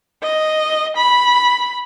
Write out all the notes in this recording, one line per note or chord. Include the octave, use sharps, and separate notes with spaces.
D#5
B5